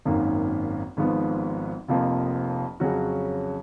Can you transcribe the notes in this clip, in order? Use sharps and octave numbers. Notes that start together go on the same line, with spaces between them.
G#1 F#2 D#3 A#3
G#1 G#2 F3 B3
F1 F2 F3 A#3
F2 C#3 F#3 C#4 F#4